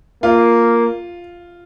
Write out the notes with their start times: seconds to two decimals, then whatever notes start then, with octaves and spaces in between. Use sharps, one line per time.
0.23 A#3 F4